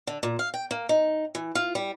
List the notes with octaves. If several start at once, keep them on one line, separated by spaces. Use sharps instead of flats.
D3
A#2
F5
G5
A#3
D#4
E3
F4
G3